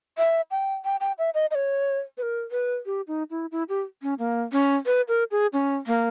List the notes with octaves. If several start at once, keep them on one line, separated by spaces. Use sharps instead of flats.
E5
G5
G5
G5
E5
D#5
D#5
C#5
B4
A#4
B4
G4
D#4
E4
E4
G4
C#4
A#3
C#4
B4
A#4
G#4
C#4
A#3